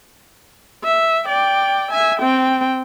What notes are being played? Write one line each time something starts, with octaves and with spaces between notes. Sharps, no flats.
E5
D5 G5
E5 G#5
C4 G5